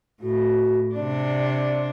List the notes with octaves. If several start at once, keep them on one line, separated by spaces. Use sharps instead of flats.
A2 F#4
C3 D4 D5